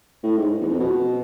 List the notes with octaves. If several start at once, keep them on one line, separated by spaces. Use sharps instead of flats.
A2
G#2
E2
F2
B2